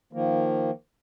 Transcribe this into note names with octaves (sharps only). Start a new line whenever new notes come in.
D#3 F3 A#3